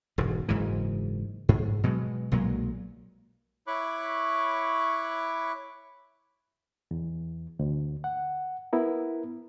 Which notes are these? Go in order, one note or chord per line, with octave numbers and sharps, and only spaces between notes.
E1 G#2
F#1 G#2 C#3 E3
G#2
B2 F#3 G#3
B1 A#2 F#3 G#3
E4 C#5 B5 C#6 D6 F#6
E2
D2
F#5
B3 E4 A#4